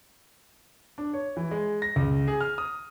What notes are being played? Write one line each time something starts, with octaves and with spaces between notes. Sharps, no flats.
D4
C#5
E3
G#3
A#6
C#2
G#4
F6
D#6